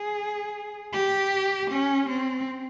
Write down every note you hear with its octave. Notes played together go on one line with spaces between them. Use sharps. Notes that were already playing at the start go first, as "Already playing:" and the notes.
Already playing: G#4
G4
C#4
C4